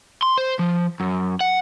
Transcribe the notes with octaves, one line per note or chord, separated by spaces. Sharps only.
C6
C5
F3
F#2
F#5